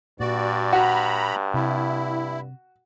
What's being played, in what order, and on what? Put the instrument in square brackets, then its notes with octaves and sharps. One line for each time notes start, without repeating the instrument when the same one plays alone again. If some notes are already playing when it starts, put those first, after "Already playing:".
[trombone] G2 [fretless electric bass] A#2 [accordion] F#4 D5
[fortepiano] F#4 [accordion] A#5 B5
[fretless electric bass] C3 [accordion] E4